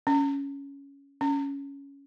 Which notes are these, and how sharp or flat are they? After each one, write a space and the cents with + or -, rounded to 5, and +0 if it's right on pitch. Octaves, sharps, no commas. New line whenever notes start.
C#4 +10
C#4 +10